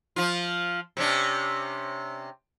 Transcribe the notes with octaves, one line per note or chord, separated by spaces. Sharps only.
F3 F4
C3 C#4 D4